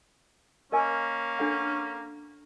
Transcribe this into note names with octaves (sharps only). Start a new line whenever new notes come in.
A#3 C#4 A#4 D#5 G#5
D4 A4 F#5